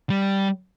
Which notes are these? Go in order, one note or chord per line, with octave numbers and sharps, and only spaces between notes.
G3